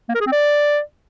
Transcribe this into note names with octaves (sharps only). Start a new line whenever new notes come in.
A#3
A#4
G#4
C4
D5